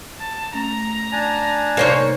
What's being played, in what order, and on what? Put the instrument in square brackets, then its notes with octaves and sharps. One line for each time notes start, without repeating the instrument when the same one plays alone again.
[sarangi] A5
[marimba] A3 C#4 [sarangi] A#5
[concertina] D4 G#5 A5
[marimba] C3 D#4 [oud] A#3 C5 C#5